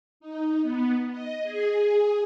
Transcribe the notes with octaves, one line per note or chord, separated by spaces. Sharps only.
D#4
B3
D#5
G#4